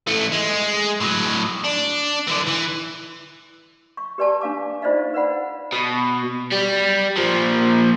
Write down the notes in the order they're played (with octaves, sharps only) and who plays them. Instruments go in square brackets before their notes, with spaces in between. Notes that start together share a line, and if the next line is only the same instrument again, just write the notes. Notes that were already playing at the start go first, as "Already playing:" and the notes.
[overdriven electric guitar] E3 A3
G#3
A2 F#3
D4
D3 E3
E3
[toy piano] C#6
G4 B4 D5 G#5 A5 C#6
D4 F5 D6
D#4 F4 C5 D5 D#5 F5
B4 D5 F#5 B5
[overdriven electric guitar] B2
G3
A#2 F3